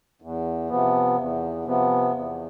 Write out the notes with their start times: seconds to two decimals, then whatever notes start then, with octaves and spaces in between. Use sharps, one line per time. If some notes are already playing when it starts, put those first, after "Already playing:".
0.22 E2
0.69 C3 F3 B3
1.17 E2
1.65 C3 F3 B3
2.13 E2